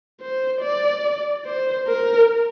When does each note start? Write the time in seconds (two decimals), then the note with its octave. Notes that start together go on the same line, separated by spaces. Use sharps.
0.21 C5
0.62 D5
1.46 C5
1.87 A#4